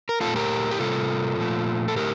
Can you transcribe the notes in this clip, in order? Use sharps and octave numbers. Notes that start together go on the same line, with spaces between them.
A#4
A#2 A3 F4 A4
G4 A#4
G4
C3 G3 A#3 F4 A4
A#2 F3 A3
A4
A2 A3 G4 A#4